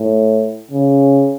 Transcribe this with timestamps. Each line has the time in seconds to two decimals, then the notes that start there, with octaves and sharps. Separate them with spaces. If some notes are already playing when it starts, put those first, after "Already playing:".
Already playing: A2
0.71 C#3